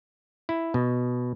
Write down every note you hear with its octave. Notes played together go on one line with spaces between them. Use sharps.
E4
B2